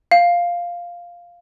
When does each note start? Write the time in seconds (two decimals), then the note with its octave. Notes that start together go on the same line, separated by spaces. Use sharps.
0.11 F5